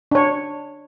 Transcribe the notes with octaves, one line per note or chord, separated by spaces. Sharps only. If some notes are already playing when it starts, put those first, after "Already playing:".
D4 C#5